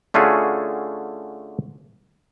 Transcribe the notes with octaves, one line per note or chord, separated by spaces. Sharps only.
D3 A3 C#4 F4 F#4 G#4